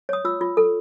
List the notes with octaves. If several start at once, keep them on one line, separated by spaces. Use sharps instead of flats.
C#5 D#6
F4 E6
F4
A4